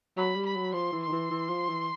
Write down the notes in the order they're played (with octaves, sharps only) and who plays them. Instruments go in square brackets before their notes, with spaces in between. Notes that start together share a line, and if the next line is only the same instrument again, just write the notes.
[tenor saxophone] F#3 [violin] B5
[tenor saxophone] G3
[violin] B5
[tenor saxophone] F#3
[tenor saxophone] F3 [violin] C6
[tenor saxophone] E3
[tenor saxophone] D#3 [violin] C6
[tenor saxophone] E3
E3
F3
E3